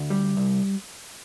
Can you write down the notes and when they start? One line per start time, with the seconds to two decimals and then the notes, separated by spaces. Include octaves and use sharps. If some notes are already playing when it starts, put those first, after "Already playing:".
Already playing: D2
0.10 G3
0.37 C2